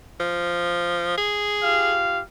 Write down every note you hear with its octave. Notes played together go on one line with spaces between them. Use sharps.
F3
G#4
F4 G4 F5